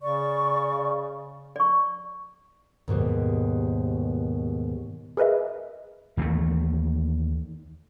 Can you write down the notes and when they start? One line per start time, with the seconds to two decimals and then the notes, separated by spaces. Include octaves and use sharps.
0.01 C#3 D5 C#6
1.56 D5 C#6
2.88 D#2 G#2 B2 G3
5.17 G#4 A#4 B4 D#5 E5
6.17 D#2 E3 F#3 A3